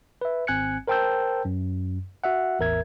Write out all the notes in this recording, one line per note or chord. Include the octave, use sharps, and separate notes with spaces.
B4 E5
G#1 C4 G#5 F#6 G#6 C#7
A#4 C5 G5 A5 E6 G6
F#2
F#4 E5 F#5
A1 E2 A#4 E5 G#6